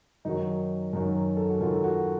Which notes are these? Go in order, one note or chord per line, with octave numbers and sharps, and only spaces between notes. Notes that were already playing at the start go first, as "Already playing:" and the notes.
F#2 D#3 F#3 D#4
F#2 D#3 F#3
A4
F#4
F#2 D#3 F#3 F4
A4
F#4